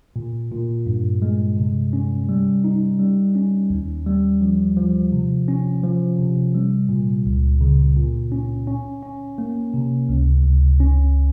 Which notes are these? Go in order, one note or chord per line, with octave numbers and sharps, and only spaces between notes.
A#2
A#2
G2
G#3
C3
C#4
G3
D#4
G3
C#4
D#2
G3
F3
F3
C3
C#4
F3
C3
G3
A#2
C#2
C#3
A#2
C#4
C#4
C#4
A#3
C3
C#2
C#2
C#4